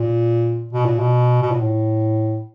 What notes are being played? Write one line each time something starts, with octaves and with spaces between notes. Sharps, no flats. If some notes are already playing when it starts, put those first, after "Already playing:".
Already playing: A#2
B2
A#2
B2
B2
A#2
A2